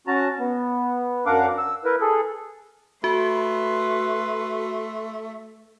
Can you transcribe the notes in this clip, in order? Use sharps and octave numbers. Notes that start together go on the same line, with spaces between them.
C#4 F#4 A5 A#5
B3
F#2 D4 A#4 F5 F#5 D6
E6
E4 A#4 B4
G#4 A4
A3 F#4 B4 C6